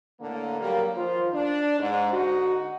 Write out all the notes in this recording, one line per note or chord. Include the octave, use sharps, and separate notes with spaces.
A2 D3 A#3
F#3 G3 A#3
D#3 F3 F4 C5
D4
G#2
D3 D#4 F#4